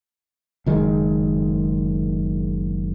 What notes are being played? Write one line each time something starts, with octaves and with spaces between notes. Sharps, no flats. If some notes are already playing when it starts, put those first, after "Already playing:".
F#1 D#3 G#3